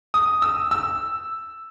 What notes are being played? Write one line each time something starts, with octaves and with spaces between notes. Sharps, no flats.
D#6
E6
E6